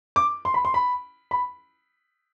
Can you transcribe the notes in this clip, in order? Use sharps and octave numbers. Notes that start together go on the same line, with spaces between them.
D6
C6
B5
C6
B5
B5